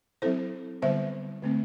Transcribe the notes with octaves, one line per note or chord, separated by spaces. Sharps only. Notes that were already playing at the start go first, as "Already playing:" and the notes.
F#3 C4 E4 A4 C5
D3 G3 B3 C5 E5
D3 A3 C4